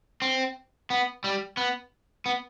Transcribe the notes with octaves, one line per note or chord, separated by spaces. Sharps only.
C4
B3
G3
B3
B3